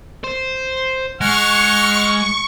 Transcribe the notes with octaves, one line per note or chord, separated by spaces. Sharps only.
C5
G#3 F#5 C#6 F6